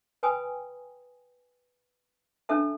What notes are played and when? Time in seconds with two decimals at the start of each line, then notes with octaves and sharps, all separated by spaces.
0.23 B4 G5 G#5 B5 D#6
2.49 C#4 D4 A4 E5 A5